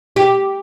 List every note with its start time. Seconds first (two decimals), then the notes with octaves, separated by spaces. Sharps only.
0.16 G4